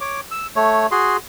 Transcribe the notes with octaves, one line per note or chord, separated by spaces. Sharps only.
C#5 D6
E6
A3 C#5
F#4 G#4 C6